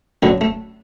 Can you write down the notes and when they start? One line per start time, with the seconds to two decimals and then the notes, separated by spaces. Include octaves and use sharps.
0.23 F#2 D3 F#3 A3
0.41 A3